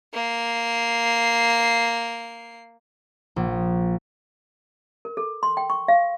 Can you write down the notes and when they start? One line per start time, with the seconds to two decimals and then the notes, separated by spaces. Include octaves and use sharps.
0.14 A#3 C7
3.36 A#1
5.05 A#4
5.17 A4
5.43 C6
5.57 G5
5.70 C#6
5.88 F5